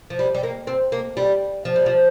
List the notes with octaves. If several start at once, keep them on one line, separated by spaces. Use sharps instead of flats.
F3
G3
G3
A#3
C4
A#3
G3
F3
G3
F3